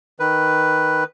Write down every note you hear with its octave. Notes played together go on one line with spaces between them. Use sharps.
D#3 B4